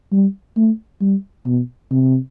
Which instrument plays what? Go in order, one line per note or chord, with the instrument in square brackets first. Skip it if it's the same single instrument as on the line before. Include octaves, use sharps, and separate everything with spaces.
[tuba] G3
A3
G3
B2
C3